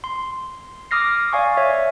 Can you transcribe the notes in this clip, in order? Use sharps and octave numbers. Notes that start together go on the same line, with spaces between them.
C6
D6 D#6 F6 A#6 C7
D5 F5 G#5 C#6
C#5 E5